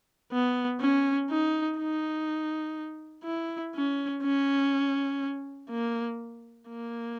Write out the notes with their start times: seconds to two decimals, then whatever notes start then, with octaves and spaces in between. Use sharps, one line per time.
0.32 B3
0.80 C#4
1.30 D#4
1.79 D#4
3.25 E4
3.75 C#4
4.23 C#4
5.70 A#3
6.69 A#3